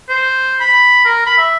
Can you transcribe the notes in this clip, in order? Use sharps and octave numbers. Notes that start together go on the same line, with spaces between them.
C5
B5
A#4
B5
E5